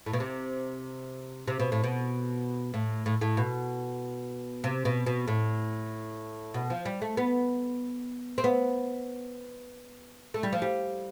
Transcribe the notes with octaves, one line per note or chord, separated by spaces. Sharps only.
A2
B2
C3
C3
B2
A2
B2
A2
A2
A2
B2
C3
B2
B2
A2
B2
F3
G3
A3
B3
C4
B3
A3
G3
F3
G3